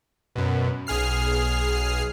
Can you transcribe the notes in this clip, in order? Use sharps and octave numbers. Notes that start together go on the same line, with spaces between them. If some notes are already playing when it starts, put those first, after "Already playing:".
F#2 B2
B1 G#4 F6 C7